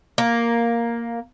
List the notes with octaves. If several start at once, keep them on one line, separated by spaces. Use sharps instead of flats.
A#3